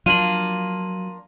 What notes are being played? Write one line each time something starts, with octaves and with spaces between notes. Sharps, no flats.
F3 F#3 A#3 D4 F4 D#7 F#7